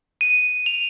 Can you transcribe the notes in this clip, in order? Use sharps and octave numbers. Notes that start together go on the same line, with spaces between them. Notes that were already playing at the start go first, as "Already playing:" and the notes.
D#7
F7